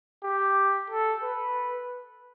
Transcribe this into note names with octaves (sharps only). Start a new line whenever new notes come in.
G4
A4
B4